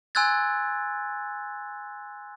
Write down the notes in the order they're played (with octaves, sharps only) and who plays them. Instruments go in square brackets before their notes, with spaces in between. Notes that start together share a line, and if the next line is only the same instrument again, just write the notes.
[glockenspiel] G#5 C6 E6 F#6 G#6 A6